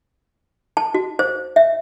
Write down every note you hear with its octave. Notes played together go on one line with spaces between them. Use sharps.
A5
F#4
C5
E5